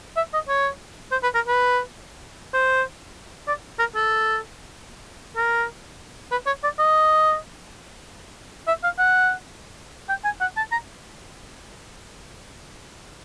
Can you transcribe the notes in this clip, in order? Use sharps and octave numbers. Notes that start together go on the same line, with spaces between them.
E5
D#5
C#5
C5
B4
A#4
B4
C5
D5
A#4
A4
A#4
B4
C#5
D5
D#5
E5
F5
F#5
G5
G#5
F#5
A5
A#5